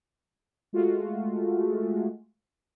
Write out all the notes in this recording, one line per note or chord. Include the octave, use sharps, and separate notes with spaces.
G#3 A3 F4 F#4